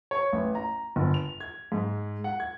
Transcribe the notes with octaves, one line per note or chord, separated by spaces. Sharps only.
C#5
A1
A#5
G1
F7
G#6
G#2
F#5
G#6